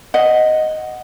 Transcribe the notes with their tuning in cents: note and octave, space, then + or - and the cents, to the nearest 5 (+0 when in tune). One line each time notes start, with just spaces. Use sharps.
D#5 +0 F#5 +0